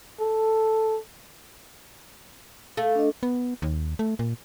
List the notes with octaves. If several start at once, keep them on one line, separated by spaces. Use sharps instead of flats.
A4
A3 F5
D4 D#5
B3
D#2
A3
A#2